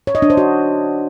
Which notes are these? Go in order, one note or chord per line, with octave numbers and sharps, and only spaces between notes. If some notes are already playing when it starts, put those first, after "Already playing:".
C#5
D#5
D4
C5
F#4